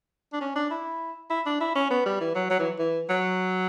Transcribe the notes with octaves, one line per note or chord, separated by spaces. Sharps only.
D4
C#4
D4
E4
E4
D4
E4
C#4
B3
G3
E3
F#3
F#3
E3
E3
F#3